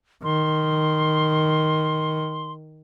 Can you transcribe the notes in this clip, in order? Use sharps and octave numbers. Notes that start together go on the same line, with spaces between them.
D#3 C6